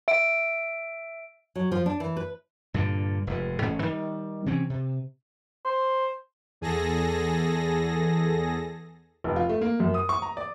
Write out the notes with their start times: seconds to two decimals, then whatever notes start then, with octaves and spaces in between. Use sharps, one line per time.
0.08 E5 D7
1.55 F#3
1.72 F3
1.86 D4
2.00 E3
2.17 B4
2.74 G2 A#2 D3
3.27 F1 G#2
3.61 A1 G#2 A3 C#4
3.82 D#3 G3
4.46 C3 E3 C4 C#4
4.70 C3
5.65 C5
6.61 E2 G#4 A4 A#6
9.24 F1
9.36 F4
9.49 A3
9.61 A#3
9.80 F#2
9.94 D#6
10.09 C#6
10.22 A#5
10.37 D5